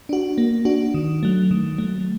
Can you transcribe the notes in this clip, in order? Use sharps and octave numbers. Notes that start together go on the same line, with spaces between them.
D4 F#4
A#3
D4 F#4
D#3
F#3 A3
D#3
F#3 A3